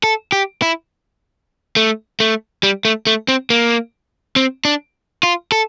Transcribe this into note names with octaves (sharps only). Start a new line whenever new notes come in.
A4
G4
E4
A3
A3
G3
A3
A3
C4
A#3
C4
D4
F4
A4